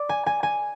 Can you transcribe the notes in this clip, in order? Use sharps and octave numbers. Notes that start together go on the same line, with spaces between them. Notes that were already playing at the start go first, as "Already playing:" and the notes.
Already playing: D5
G#5
G#5
G#5